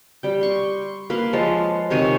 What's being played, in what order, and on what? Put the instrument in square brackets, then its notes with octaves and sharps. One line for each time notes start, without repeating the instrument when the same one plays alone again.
[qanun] G3 G5
C6 C#6
A#3 B4 F5 C6
F3 G#3 C#5 A5
C3 D#3 C#5 G#5